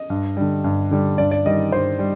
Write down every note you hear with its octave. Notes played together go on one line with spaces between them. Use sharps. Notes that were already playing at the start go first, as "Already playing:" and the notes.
Already playing: D#5
G2
D3 G3
G2
D3 G3
G2 D5
D5
D#3 G3 D#5
G2 C5
G3